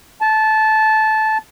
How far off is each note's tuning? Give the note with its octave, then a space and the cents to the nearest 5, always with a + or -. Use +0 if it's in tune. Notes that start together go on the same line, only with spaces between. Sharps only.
A5 -15